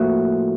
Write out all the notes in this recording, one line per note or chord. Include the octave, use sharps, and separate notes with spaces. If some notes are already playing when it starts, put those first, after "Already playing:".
Already playing: A2 F3 A#3 F#4